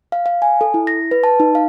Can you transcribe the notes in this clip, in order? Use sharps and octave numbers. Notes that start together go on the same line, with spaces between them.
F5
F5
G#5
A4
E4
A#6
B4
A5
D#4
F5